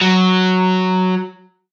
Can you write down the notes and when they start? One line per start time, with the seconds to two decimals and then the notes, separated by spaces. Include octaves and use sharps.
0.01 F#3